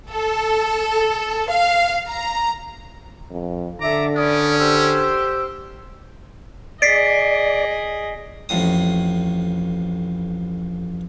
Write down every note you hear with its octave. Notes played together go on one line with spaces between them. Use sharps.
A4
F5
A#5
F2
D3 A4 E5 A#5 D6
C#4 B4 D5 D#6
G4 C5 E6
G#4 D5 D#5 B6 C7 D7
A1 F2 A2 D#6